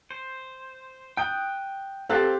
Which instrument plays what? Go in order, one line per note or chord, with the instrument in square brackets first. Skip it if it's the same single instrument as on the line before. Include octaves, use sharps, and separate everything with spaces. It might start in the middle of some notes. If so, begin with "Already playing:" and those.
[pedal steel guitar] C5
[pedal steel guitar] G5 D#6 F#6 [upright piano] G6
[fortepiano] C4 G4 [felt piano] A4 [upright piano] F5 F#6 A6